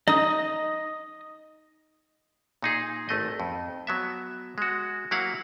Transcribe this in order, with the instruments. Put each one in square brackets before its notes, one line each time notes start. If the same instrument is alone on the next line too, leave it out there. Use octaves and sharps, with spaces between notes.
[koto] D#4 [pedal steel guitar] D#5 D#6
[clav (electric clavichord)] A#2 D#4 G#4
G#1 A3 D#5
F2
F#3 B3 E5
G#3 F#4
F#3 A#3 E4 F5 F#5